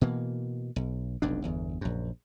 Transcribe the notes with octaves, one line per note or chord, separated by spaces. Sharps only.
B2 E3 A#3
B1
F1 B1 F2 D4
G1 E2
A#1 F#2